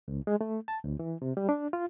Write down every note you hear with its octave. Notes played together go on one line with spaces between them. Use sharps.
C#2
G#3
A3
A5
D2
E3
C3
G3
D4
F4